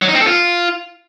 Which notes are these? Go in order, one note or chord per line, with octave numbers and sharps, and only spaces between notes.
F#3
D#4
C4
A4
F4